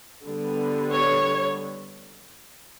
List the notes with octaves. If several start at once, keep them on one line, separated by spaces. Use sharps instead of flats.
D3 G3 B3
C#5